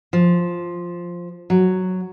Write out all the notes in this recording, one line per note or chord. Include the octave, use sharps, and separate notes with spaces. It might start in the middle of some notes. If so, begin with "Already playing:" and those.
F3
F#3